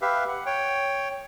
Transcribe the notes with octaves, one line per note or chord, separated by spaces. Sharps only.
G4 B4 E5 F5
F#5
C#5 G5